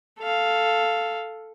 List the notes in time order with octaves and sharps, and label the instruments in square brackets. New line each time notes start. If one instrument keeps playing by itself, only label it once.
[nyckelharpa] A4 F5